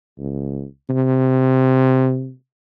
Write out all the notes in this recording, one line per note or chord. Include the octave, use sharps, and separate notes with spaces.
C#2
C3